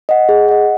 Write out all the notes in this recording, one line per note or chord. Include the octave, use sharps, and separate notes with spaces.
D#5 F#5
G#4
D#5 F#5